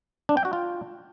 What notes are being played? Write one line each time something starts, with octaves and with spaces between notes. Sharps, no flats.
D4
G5
F#4
F4